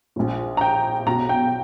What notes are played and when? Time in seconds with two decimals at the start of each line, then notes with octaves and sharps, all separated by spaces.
0.16 A#1 A#2
0.57 A#5
0.61 G5
1.06 B1 B2 A#5
1.29 G5